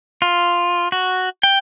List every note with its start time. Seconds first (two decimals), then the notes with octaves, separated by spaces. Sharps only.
0.22 F4
0.92 F#4
1.43 G5